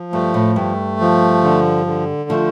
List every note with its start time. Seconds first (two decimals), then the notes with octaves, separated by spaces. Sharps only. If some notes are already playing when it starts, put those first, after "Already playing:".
Already playing: F3
0.13 G2 A3
0.34 A2
0.56 G2 A3
1.00 F3
1.43 D3
1.86 D3
2.30 F3 A3